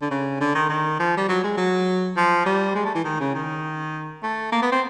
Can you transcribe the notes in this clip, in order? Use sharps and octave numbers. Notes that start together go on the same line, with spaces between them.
D3
C#3
D3
D#3
D#3
F3
G3
F#3
G#3
F#3
F3
G3
G#3
A3
E3
D#3
C#3
D#3
A3
A#3
B3
C4